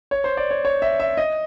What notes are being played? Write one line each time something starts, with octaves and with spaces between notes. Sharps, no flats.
C#5
C5
D5
C#5
C#5
E5
E5
D#5